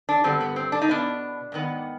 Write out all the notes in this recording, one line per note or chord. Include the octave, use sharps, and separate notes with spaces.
D4
G2 D3 G3 B3 C4
B3
C4
D4
D#4
B2 B3 D4
G#2 D#3 B3